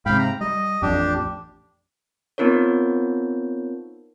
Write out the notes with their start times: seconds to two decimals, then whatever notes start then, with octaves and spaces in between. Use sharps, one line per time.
0.06 G#2 C3 F5 G5 B5
0.19 A#5
0.41 G3 D#5
0.82 A1 F2 D4 G4
2.38 B3 C4 D#4 F4 A#4 C#5